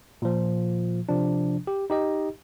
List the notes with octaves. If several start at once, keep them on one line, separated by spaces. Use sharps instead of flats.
A#2 F3
C3 F3 D4
G4
D#4 G4 D#5